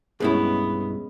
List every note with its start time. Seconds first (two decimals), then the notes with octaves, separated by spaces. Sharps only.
0.20 B1 G2 G#3 B3 C#4 E4